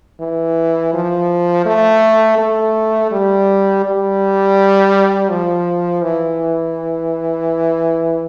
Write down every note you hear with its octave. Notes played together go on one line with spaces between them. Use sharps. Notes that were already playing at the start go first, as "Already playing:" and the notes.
E3
F3
A3
A3
G3
G3
F3
E3